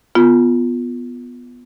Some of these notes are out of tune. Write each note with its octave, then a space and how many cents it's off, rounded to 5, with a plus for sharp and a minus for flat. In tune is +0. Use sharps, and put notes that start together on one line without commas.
B3 +0 F4 +0